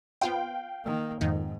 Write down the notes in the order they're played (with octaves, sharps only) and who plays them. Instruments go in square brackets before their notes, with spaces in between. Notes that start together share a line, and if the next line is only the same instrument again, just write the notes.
[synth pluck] B3 F4 C5 [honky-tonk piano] F5 G5
[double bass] D#3 A#3
[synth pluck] F2 D#3 D#4 [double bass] G#2